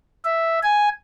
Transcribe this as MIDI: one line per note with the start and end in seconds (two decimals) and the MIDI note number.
0.25 0.59 76
0.63 0.89 80